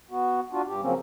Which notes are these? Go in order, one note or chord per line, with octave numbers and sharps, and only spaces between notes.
B3 F#4
D4 F4 F#4
G2 G4
C#3 F3 F#3 A#3 C4 C#4